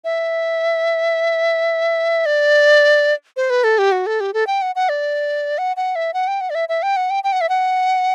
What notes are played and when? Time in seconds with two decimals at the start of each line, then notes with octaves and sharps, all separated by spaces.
0.04 E5
2.26 D5
3.37 C5
3.50 B4
3.64 A4
3.78 G4
3.92 F#4
4.06 A4
4.20 G4
4.34 A4
4.47 G5
4.62 F#5
4.76 F#5
4.89 D5
5.58 F#5
5.77 F#5
5.95 E5
6.14 F#5
6.28 G5
6.41 F#5
6.50 D5
6.55 E5
6.69 E5
6.83 G5
6.96 F#5
7.10 G5
7.24 G5
7.32 F#5
7.41 E5
7.49 F#5